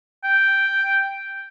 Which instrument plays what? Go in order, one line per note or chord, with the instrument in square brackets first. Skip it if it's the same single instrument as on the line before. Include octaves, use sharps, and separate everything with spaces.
[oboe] G5